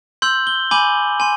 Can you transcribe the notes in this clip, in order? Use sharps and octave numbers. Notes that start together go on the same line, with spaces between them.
C6 E6 G6 F#7
G7
G#5 B5 D6 G6 F#7
G#5 C6